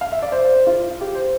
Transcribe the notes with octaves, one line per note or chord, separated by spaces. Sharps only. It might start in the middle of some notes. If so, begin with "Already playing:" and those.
F5
E5
D5
C5
F4
G4
C5